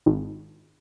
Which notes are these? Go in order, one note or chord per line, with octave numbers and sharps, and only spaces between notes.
G#1